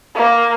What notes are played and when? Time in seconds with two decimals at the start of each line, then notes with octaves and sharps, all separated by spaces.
0.16 A#3